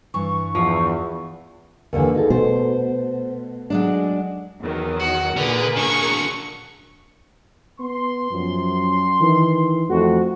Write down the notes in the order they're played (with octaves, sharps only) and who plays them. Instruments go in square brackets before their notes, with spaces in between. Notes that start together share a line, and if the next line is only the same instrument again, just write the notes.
[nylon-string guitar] G2 E3 [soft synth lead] C#6
[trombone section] E2 [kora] F3
[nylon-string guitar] D#2 D3 E3
D#4 G#4 A4
[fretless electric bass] B2 [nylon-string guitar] A3 [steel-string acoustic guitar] C5
[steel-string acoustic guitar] F#3 G#3 D4
[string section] E2 D#3 F#3
[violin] F#4
[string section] A#2 G#4 A#4 [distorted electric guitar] D3 [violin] B4
[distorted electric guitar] D3 F#3 [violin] C#6
[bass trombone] B3 [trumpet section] C6
[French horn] F#2 [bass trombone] F3
[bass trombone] D#3 [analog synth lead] E3
[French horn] F2 [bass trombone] A3 [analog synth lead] F#4